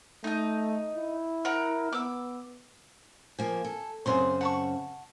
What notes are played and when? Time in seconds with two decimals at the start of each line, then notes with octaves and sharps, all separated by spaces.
0.24 A3 D#4 D#5
0.96 E4
1.45 A#4 F#5 A#5
1.92 B3 D6 E6
3.39 F3 A#3 G#5
3.64 A4
4.06 F#2 C#3 C4 G#4 C5 C6
4.41 F#5 A5 C#6